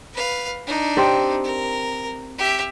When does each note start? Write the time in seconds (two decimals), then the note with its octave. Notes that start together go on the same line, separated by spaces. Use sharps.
0.13 B4 F5
0.67 D4 D#4
0.97 C4 G4 D5
1.44 A#4
2.38 G4 E5